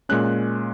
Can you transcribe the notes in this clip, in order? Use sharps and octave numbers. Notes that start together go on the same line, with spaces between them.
A#2 G#3 C#4 F#6